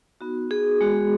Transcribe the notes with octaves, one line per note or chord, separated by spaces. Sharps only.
B3 D#4 F#4
G#4
G#3 B3 F#4